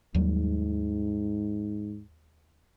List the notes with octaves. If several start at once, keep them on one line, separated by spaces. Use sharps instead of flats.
D#2 G#2 F#3 G3